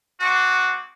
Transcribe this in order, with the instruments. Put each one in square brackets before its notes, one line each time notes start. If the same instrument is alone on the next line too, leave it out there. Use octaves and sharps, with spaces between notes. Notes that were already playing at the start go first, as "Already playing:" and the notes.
[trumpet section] G#3 C4 F#4 D6